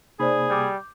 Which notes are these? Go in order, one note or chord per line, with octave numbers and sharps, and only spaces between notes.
C3 A#3 D#4 G#4 C5 D5 B5
G3 D6 G6